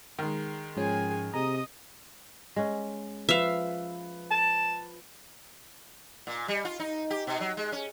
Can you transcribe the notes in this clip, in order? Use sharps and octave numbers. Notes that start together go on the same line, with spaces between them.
D#3 G#3
G#2 F3 C#4 G#4 G#5
C3 G#4 D#5 A#5 D#6
G#3 C#4
F3 B4 E5 F5
A5
A#2
G3
F4
D#4
G4
B2
F#3
G#3
C#4